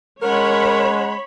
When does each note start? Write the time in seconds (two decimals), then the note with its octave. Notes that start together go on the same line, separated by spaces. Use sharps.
0.22 G#3 C#4 A#4 C#5 F#5 B5